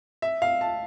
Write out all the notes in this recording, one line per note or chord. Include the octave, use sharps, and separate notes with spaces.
E5
F5
A5